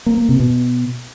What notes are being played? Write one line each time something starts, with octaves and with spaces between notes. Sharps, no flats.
A#3
A#3
C3
B2